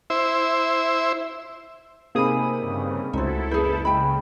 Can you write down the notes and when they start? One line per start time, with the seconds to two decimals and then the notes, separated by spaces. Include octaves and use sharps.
0.10 E4 C5 E5
2.15 C3 A#3 D#4 G#4 B5 D#6
2.61 G2 C#3
3.13 C#2 A3 D#4 E4 F#4 A4 C5
3.51 F#1 G#4 B4 G6
3.85 C#3 G#3 G5 B5